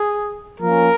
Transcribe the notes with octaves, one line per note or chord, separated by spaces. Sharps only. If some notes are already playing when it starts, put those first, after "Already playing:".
Already playing: G#4
F3 A#3 C#4 A#4